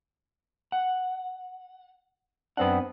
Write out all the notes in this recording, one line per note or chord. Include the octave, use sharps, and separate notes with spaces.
F#5
F#2 B3 C4 D4 F#5